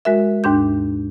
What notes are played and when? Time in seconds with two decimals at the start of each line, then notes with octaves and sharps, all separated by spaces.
0.05 G#3 F#4 A#4 E5
0.44 D#2 G#2 D4 G6